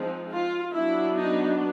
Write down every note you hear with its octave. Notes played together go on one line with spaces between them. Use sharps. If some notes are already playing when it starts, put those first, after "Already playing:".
Already playing: F3 G#3 C4 D#4
F4
F#3 B3 D4 E4
D#4